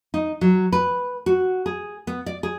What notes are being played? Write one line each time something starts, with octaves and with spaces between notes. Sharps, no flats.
D#4
F#3
B4
F#4
G#4
B3
D5
G#4